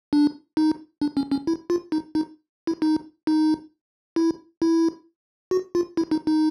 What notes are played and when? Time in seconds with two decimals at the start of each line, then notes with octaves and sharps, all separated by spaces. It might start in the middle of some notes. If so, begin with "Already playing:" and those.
0.13 D4
0.57 D#4
1.02 D4
1.17 C#4
1.31 C#4
1.47 E4
1.70 F4
1.92 D#4
2.15 D#4
2.67 E4
2.82 D#4
3.27 D#4
4.16 E4
4.62 E4
5.51 F#4
5.75 F4
5.97 E4
6.11 D#4
6.27 D#4